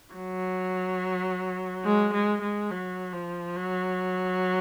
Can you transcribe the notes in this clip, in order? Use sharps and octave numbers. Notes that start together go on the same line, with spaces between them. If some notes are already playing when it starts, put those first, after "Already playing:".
F#3
G#3
G#3
G#3
F#3
F3
F#3